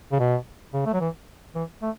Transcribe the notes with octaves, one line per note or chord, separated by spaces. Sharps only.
C#3
B2
C#3
A3
F#3
E3
E3
A3